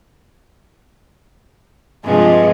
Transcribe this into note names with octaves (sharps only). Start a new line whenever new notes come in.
G2 C3 F3 G#3